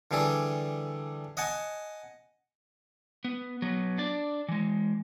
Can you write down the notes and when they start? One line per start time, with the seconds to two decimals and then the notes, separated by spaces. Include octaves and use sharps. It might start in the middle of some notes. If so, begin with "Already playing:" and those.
0.11 D3 E3 G3 G#4 A4
1.37 D#5 F#5 G#5 A5
3.25 B3
3.62 F#3 B3
3.98 D4 D5
4.49 E3 G#3